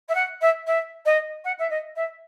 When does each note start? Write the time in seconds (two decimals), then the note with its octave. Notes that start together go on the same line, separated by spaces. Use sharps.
0.08 E5
0.14 F#5
0.41 E5
0.66 E5
1.05 D#5
1.44 F#5
1.58 E5
1.70 D#5
1.96 E5